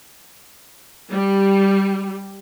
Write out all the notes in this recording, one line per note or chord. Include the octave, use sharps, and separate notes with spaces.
G3